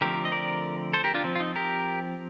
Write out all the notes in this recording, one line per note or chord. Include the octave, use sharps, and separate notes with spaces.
D3 F3 A3 C4 G4 A#4
D#5
A#4 D5
A4 C5
G4 A#4
D4 F4
F3 C4
F4
D#4
G4 A#4